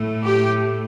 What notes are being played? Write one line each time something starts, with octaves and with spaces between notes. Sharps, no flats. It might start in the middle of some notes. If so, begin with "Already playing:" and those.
Already playing: A2 A3
G4